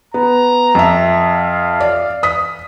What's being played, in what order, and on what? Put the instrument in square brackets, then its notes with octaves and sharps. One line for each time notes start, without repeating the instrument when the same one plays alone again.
[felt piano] B3 [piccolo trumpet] A#5
[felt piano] F2 E5
[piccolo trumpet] F5
[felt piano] D5
D#6 B6